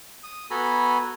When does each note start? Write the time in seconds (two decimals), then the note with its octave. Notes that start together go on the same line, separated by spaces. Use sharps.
0.24 D#6
0.51 B3 F#4 A4 G#5 A#5 B5